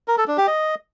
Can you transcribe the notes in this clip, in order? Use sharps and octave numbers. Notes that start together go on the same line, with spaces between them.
A#4
A4
D4
G4
D#5